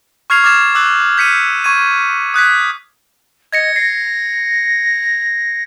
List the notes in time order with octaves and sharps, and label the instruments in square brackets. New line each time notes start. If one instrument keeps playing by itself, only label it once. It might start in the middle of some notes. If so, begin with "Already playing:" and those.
[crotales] C#6 F6 G#6 C7 F7
D6 F6 G#6 A6 E7
D6 E6 F#6 F#7
G6 B6 C#7 D#7
C#6 G#6 D#7
D#6 F#6 G#6 B6
[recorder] D#5 [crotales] G#6 A#6 C#7
[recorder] A#6 [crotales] C7